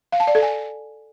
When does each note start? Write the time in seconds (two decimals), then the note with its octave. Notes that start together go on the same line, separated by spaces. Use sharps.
0.12 F5
0.20 A5
0.27 D5
0.35 A4
0.42 G#5